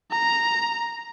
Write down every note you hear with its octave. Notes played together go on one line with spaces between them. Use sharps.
A#5